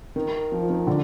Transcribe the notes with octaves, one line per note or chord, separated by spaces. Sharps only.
D#3
F3
D#3
D3